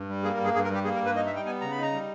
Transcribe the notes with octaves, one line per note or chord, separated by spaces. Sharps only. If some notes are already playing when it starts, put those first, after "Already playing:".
Already playing: G2
G3
A#3 G#4
A#4
G2 G#4
G2 G#4
A#4
G3 G4
A#3 G#4
A#4
G2
B4
D#4 D#5
E5
G3 G5
B3 G#5
C#3 A#5
B5
D#4
A#5
G3